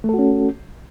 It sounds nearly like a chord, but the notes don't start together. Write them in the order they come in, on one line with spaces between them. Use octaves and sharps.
A3 A4 F#4 C#4